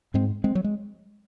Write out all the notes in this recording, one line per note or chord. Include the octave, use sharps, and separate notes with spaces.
G#2 G#3 C4
G#3 C4
F#3
G#3